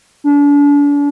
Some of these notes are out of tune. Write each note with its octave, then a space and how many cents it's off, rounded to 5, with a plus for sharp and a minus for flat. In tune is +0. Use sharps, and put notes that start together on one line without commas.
D4 -40